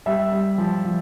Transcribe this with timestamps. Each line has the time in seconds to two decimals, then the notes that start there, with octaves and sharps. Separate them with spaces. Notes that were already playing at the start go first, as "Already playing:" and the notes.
0.06 G3 E5
0.32 G3
0.58 F3
0.85 F3